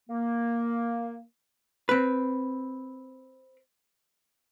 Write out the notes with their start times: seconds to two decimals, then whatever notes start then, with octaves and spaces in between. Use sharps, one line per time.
0.10 A#3
1.89 C4 B4